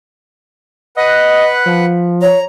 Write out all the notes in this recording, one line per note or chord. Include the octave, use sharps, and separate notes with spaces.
B4 D#5 F#5
F3
C#5 A#5